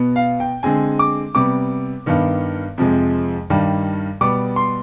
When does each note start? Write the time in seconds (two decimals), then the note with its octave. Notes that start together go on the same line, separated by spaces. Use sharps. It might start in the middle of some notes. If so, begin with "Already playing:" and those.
Already playing: B2 B3
0.16 F5
0.40 G5
0.63 D3 G#3 C4 G#5
0.99 D6
1.35 C3 G3 B3 D6
2.06 G2 D#3 B3
2.78 F2 C3 F3 G#3
3.50 G2 D#3 G3
4.21 B2 G3 B3 D6
4.56 C6